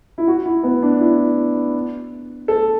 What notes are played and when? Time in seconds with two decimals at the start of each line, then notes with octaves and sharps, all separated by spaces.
0.18 E4
0.27 F#4
0.46 E4
0.63 B3
0.82 D4
1.01 E4
2.48 A4